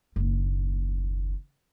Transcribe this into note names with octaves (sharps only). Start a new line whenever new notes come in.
F#1 D#2